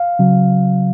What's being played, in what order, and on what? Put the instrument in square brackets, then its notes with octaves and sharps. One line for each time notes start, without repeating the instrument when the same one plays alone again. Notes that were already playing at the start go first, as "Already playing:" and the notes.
Already playing: [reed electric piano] F5
C#3 F#3